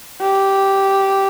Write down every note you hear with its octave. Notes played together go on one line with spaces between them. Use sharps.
G4